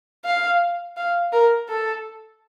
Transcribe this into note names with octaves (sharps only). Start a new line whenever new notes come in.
F5
F5
A#4
A4